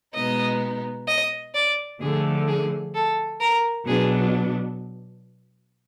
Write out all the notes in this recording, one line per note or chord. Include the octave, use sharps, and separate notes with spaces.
B2 G#3 B3 D#4 D#5
D#5
D5
D3 F3 A3 G#4
G#4
A4
A#4
B2 F#3 B3 D4 G#4